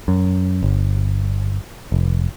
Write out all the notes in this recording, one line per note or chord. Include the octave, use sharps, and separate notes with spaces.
F#2
G1
F1